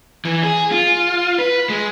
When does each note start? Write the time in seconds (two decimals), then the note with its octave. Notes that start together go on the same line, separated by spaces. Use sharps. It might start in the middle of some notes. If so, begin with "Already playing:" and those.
0.25 E3
0.43 G#4
0.72 F4
1.39 B4
1.70 G#3